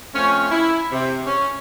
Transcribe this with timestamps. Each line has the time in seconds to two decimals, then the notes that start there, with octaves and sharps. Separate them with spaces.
0.14 F3 A3 C4 C#4
0.51 E4
0.92 C3
1.26 C#4